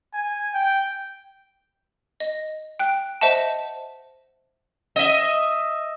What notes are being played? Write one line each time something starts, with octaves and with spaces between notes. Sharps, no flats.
G#5
G5
D#5
G5 F#6
C5 D#5 E5 F#5 A5
D#5 E5